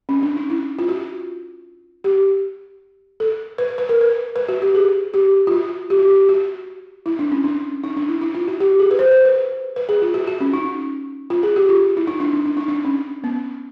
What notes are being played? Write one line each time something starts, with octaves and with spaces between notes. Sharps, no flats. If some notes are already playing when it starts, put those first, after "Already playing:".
C#4
D4
D#4
E4
F4
F#4
G4
A4
B4
B4
A#4
B4
B4
F#4
G4
G#4
G4
F4
F#4
G4
F#4
G4
F#4
E4
D4
C#4
D4
D#4
D4
E4
E4
F4
F#4
G4
G#4
B4
C5
C5
B4
B4
G#4
F4
F#4
F#4
C#4
D#4
F4
G#4
G4
F4
E4
D#4
D4
D4
D4
D#4
D4
C#4
B3